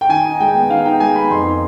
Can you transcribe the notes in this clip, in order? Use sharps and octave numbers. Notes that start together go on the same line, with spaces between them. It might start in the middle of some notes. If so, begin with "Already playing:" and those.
G5
D#3 G#5
D#4
G#3 G5
B3
D#3 F5
D#4 G5
G#3 G#5
B3 B5
F2 C6
D#4